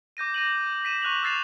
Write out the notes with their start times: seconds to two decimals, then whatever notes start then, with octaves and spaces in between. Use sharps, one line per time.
0.17 D6 G6 A#6 D#7
0.34 A#6 D#7 F#7
0.85 B6 D#7 E7
1.02 C#6 F#6 F7 F#7
1.23 E6 F#6 A6 C7 E7 F7